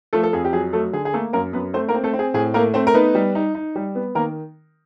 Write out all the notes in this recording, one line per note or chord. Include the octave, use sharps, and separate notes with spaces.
F3 A3 A4
A4
F2 G#4
G4
F#3 G#4
F#3 A3 A4
D3 G#4
G#4
A3 A#3 A4
F#2 A#3 A#4
F#2 B3 B4
A3 C4 C5
A#3 A#4
C4
A3 A4
C4
G#4
A2 G#4
A3 A#3 A#4
A3 C4 C5
A#4
B3 D#4 B4
G3
D#4
D#4
G3
B3
D#3 A#3 A#4